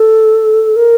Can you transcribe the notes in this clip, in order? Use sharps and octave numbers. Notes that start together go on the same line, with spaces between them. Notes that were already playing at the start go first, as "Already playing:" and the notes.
Already playing: A4
A#4